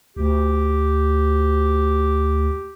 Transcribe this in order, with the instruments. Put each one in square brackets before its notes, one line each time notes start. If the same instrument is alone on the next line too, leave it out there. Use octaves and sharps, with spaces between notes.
[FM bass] D2 [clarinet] G4